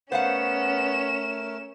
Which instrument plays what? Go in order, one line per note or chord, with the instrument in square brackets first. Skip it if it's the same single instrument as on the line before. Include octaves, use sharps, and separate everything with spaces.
[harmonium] A3 A#4 [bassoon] B3 [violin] C#4 E7 [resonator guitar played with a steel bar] C5 F5 F#5